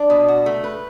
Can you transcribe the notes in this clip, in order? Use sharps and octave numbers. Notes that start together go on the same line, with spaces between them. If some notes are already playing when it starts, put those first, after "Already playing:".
Already playing: D4
B2
F#4
A3
B4